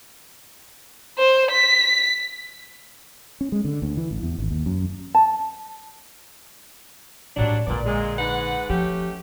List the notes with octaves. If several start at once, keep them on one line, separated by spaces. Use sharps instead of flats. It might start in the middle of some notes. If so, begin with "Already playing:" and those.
C5
B6
C#4
G#3
D3
D2
E3
A1
E2
G#1
D#2
F#2
A5
A2 F#3 G3 D4 D#4
A#1 A#2 D3 B3 D5
A#2 G#3
G#2 B4 F#5
F3 A3 C#4 G4